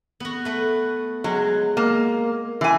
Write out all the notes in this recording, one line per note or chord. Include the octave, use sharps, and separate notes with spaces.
B3 F#4
A3 B4
F#3 G#3
A#3
E3 G#5